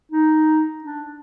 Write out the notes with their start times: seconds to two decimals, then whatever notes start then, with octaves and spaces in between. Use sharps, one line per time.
0.12 D#4
0.84 D4